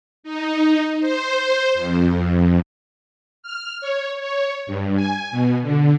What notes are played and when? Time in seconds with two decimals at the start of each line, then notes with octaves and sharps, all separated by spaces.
0.23 D#4
1.00 C5
1.74 F2
3.43 F6
3.81 C#5
4.21 C#5
4.67 G2
4.96 G#5
5.31 B2
5.62 D3